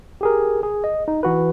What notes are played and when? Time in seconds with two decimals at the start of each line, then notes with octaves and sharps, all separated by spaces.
0.21 G4 G#4 A#4
0.63 G#4
0.84 D#5
1.08 D#4
1.23 E3 F#4 B4